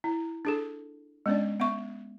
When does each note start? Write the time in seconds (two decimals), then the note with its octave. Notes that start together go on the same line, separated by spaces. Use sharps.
0.04 E4
0.45 D4 G#4 A4
1.26 G#3 B3 C#4 D4 D5
1.60 B3 E5 C#6